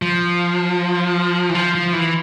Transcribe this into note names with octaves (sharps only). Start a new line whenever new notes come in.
F3
E3
F3
F3
E3